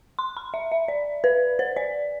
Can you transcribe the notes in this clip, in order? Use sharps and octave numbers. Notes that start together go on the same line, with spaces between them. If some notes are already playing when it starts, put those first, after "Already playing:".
C6
B5
E5
E5
D5
B4
C5
D5